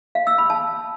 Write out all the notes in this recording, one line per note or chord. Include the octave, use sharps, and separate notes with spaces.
F5
E6
B5
A5